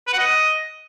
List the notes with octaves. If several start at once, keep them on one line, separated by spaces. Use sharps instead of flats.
B4
F#5
D#5